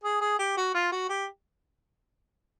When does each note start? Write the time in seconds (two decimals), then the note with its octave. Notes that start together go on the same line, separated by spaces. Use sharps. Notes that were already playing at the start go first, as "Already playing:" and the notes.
0.04 G#4
0.21 G#4
0.39 G4
0.57 F#4
0.74 F4
0.92 F#4
1.09 G4